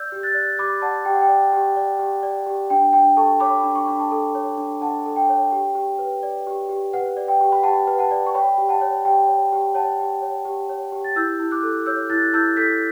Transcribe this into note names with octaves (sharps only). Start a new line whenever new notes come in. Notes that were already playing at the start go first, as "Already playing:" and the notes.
Already playing: D5 E6 G6
G4
F#6 A6
D5
G4 B5 D6
D5 F#5 A5
G4 G5
F#5
G5
D5
G4
D5
G4
D5
G4
D4 G5
D4 G5
A4 A5 C#6
C#5 B5 D6
D4
C#6
D4 B5
A5 C#6
A4
C#5
D4
D4 F#5 A5
A4
G5
C#5
G4
G4
B4
D5
G4
G4
B4 F#5
D5
G5
G4
B5
G4 F#5 A5
B4
F#5 A5
D5
C#6
C#5 G5 B5
G4
F#5 A5
C#5
G4 G5
C#5
G4
C#5 F#5 A5
G4
C#5
G4
C#5
G4
A6
E4 E6 G6
E4
D6 F#6
A4
C#5 E6 G6
E4 F#6 A6
E4 E6 G6
A4 G6 B6